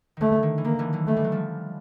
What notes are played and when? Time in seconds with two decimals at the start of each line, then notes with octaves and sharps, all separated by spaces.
0.17 D3 D#3 A3
0.43 D#3
0.58 E3
0.64 D#3 A#3
0.79 D3 E3
0.93 E3 F#3
1.07 G#3 A3
1.17 G3
1.24 F#3
1.32 F3 G3